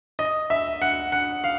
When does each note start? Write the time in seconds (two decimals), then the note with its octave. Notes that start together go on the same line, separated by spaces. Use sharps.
0.19 D#5
0.50 E5
0.82 F#5
1.12 F#5
1.44 F5